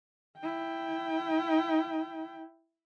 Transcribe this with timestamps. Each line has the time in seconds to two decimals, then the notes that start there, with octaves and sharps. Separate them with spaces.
0.39 E4 G5